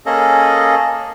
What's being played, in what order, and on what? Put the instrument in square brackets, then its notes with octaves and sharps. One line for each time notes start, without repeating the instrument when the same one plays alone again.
[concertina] A#3 C#4 G#4 A4 D#5